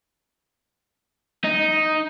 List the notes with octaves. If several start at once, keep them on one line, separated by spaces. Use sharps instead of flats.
D#4